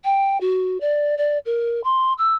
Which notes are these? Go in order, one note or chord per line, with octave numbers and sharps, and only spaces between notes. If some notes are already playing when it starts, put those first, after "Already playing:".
G5
F#4
D5
D5
A#4
C6
E6